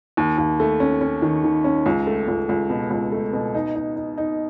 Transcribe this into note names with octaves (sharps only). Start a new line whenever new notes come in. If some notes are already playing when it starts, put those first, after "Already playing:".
D#2
D#2
A3
C#4
C#4
D#3
D#3
C#4
C#2
A3
C#2
C#2
B2
C#2
A3
B2
D#4
D#4
D#4
D#4